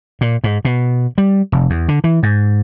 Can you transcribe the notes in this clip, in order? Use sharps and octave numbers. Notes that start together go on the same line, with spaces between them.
A#2
G#2
B2
G3
F1
E2
D3
E3
G#2